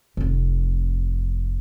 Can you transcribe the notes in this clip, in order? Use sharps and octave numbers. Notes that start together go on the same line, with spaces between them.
F1 F2